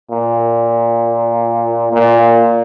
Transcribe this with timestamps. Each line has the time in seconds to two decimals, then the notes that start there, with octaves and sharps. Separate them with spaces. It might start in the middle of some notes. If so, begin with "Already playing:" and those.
0.11 A#2
1.93 A#2